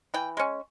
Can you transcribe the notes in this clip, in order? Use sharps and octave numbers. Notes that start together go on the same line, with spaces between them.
E3 G5
G#3 C#4